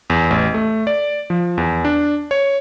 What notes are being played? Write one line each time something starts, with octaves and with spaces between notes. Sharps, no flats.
E2
A1
A3
D5
F3
E2
D4
C#5